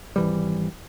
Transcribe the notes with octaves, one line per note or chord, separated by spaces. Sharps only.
G#1 E3 G3